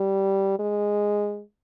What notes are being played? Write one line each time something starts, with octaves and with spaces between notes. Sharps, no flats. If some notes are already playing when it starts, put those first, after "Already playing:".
Already playing: G3
G#3